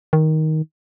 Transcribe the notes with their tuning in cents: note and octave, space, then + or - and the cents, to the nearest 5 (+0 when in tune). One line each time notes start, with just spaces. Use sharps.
D#3 +10